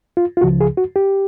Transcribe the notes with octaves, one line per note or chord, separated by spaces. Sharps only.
F4
F4
C#2 C#3 F3 F#4
G#4
F#4
G4